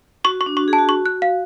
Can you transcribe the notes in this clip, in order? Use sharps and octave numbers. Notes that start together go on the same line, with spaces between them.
F#4 C#6
C#6
D4
F#4 C#6
G#4
A5
F#4
C#6
F#6
F5